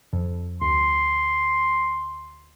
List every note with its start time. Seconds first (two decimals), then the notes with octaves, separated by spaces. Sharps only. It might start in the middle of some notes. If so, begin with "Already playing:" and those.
0.13 F2
0.62 D2 C6